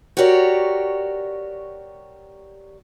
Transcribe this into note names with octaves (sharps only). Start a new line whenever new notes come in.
F#4 G4 A#4 C#5 D5